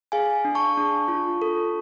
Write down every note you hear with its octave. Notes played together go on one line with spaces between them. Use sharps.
G#4 F5 G#5
D4
A5 C#6
D4
F4
A4